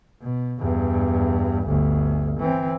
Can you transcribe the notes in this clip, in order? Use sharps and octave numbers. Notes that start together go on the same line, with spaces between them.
B2
E2 G2
G1 D2
E3 C4